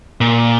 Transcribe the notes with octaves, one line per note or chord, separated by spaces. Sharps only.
A#2